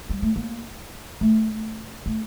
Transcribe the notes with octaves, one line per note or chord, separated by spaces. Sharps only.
G3
A3
A#3
A3
A3